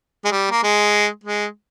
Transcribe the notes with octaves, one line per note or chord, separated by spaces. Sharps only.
G#3
G3
A#3
G#3
G#3